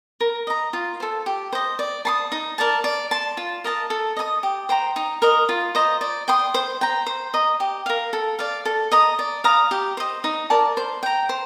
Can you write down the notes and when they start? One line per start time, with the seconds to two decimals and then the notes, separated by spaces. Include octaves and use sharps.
0.20 A#4
0.47 D#5 A#5
0.73 F4
1.00 A4 C5
1.26 G4
1.53 C5 D#5
1.79 D5
2.05 A5 C6 D#6
2.32 D#4
2.58 A#4 D5 A5
2.84 D5
3.11 A5 C6
3.37 F4
3.64 A#4 D#5 A5
3.90 A4
4.17 D#5 A5 D#6
4.43 G4
4.69 C5 G5 A#5
4.96 D#4
5.22 A#4 D#5
5.49 F4
5.75 C5 D#5 A#5
6.01 D5
6.28 G5 C6 D#6
6.54 C5
6.81 G5 A#5
7.07 C5
7.34 D#5 A#5
7.60 G4
7.86 A#4 F5
8.13 A4
8.39 D5 F5
8.65 A4
8.92 D#5 A#5 D#6
9.19 D5
9.44 F5 A#5 D#6
9.71 G4
9.97 C5 D#5
10.24 D#4
10.50 A#4 D5 A5
10.77 C5
11.03 G5 A#5
11.29 C5